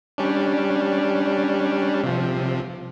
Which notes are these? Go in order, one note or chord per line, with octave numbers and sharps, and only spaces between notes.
G3 C#4 D4
C3 F3